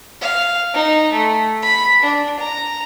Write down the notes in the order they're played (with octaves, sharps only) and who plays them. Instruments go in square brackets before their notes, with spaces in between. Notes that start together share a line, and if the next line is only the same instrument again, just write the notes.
[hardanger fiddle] F5
D#4
A3
B5
D4
A#5